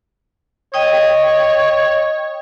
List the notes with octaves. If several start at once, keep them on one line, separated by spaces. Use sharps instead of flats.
C#5 D#5 G5 D#6